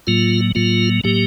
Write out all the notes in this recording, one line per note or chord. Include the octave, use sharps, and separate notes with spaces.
A2 F#3 A#3 F4
A2 F#3 A#3 F4
A2 F#3 A#3 G4